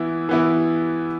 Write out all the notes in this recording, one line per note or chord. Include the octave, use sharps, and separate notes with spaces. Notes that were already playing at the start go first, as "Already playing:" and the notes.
Already playing: E3 B3 E4
E3 B3 E4